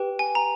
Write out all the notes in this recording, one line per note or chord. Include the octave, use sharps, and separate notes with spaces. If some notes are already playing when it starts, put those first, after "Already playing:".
Already playing: G4 B4 G5
G#5
A#5